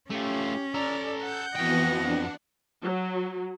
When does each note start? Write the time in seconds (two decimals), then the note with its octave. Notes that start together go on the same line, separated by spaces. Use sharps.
0.11 A3 C#4 F4 G4
0.74 A4 D5 A#5
1.22 F#5 G6
1.55 F2 E3 B3 F#4 D#5 G5
2.01 D4
2.83 F#3